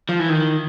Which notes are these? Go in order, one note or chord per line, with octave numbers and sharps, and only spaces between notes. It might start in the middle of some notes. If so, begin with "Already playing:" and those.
F3
E3
D#3